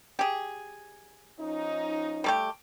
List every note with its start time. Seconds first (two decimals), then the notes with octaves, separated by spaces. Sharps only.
0.19 G4 G#4
1.40 F3 C#4 D#4
2.24 G3 A3 G4